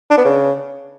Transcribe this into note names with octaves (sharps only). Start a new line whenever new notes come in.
D4
B3
C#3